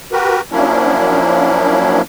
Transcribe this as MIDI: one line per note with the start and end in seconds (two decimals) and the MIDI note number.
0.12 0.41 66
0.12 0.41 67
0.12 0.41 70
0.12 0.41 71
0.52 2.02 53
0.52 2.02 54
0.52 2.02 58
0.52 2.02 61
0.52 2.02 62
0.52 2.02 64